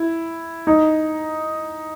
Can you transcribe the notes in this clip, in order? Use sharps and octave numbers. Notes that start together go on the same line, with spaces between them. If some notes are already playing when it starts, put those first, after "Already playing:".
Already playing: E4
D#4